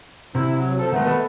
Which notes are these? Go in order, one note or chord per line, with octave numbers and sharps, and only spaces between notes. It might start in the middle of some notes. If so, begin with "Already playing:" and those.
C3 E4
F#3
F3 A4
D#3 G#3 A3 B3
A4 B4 D#5